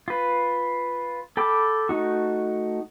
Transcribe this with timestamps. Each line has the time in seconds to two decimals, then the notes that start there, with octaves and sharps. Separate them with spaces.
0.08 F4 B4
1.37 A4 G5 B5 D6
1.89 A3 D#4 F#4